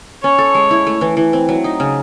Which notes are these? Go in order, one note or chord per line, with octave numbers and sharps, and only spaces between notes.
C#4 C#5
A4
G#3
E4
A3
E3
E3
C4
F#3
D#4
C#3